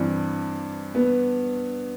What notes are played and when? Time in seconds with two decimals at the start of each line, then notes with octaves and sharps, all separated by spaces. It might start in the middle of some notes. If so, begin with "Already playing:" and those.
Already playing: G2 E3 C4 D4
0.95 B3